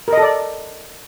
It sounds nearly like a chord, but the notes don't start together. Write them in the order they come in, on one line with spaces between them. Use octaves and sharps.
A#4 D#5 A4 D5